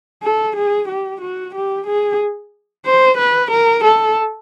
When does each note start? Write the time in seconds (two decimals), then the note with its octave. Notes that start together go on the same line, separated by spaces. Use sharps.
0.23 A4
0.56 G#4
0.88 G4
1.21 F#4
1.55 G4
1.87 G#4
2.86 C5
3.18 B4
3.51 A#4
3.84 A4